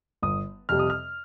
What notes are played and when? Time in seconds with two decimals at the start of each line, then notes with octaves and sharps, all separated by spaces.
0.22 G1 D#6
0.69 F2 C3 G3 F6
0.79 D#6
0.90 F6